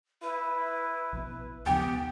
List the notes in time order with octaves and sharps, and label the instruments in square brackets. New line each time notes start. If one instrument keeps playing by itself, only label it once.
[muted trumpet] E4 [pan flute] B4
[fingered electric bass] A#1 B2
[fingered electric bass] D#2 C#3 F3 [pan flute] B3 [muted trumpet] G4 [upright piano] G5